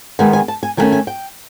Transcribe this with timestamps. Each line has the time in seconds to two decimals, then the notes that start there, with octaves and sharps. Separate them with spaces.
0.19 D#3 G#3 B3 G#5
0.33 G#5
0.48 A5
0.63 G#5
0.77 D#3 F#3 A3 C#4 G#5
0.92 G#5
1.07 G5